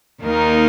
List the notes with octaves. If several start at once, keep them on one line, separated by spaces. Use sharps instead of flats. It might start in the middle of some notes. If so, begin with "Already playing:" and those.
D#2 D#3 A#3 D#4 A#4